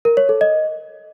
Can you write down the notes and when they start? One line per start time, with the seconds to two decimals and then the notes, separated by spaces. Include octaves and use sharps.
0.05 A#4
0.17 C#5
0.29 A4
0.41 D#5